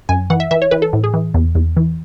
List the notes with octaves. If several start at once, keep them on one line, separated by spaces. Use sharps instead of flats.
F#2 G#5
E3 F#5
E5
E3 E5
C#5
E3 B4
A4
A2
G#4
E3
E2
E2
E3